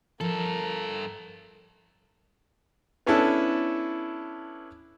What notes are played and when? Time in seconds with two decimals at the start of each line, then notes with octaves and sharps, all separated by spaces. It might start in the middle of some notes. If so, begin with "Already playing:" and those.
0.21 G2 F3 A4 A#4
3.06 B3 C#4 D4 E4 A4